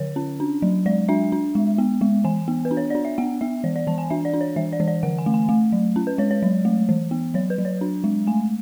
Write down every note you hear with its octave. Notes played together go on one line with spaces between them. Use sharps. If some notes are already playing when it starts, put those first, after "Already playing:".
Already playing: D3 C#5
C#4
D4
F#3
G#3 D5
D4 E5
D4
G#3
B3
G#3
E3 G#5
B3
B4
D4
C#5
D4 D5
E5
B3 F#5
B3 E5
E3 D5
D5
E3 A5
G#5
D4 E5
D5
D4
C#5
E3 E5
D5
E3
D5
D3 F#5
G#5
A3
G#5
A3
F#3
C#4
B4
G#3 C#5
C#5
F#3
A3
E3
B3
F#3 C#5
B4
F#3
C#5
D4
G#3
A3 G#5